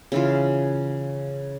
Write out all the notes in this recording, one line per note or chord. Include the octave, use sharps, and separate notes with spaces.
C#3 E3 F4